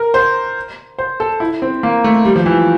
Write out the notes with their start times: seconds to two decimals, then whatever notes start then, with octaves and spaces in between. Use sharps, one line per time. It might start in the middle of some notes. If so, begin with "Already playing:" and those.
Already playing: A#4
0.14 C5
0.98 C5
1.20 A4
1.40 E4
1.62 C4
1.83 A#3
2.04 A3
2.25 G3
2.36 F3
2.46 E3